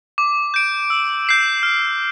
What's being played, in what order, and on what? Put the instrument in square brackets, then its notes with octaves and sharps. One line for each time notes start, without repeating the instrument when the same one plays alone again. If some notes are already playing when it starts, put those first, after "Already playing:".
[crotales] D6
G6 D7
E6
G6 C7 E7
F6